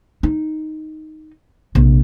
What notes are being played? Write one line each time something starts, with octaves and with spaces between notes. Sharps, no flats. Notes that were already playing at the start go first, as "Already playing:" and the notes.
D#4
A#1 C3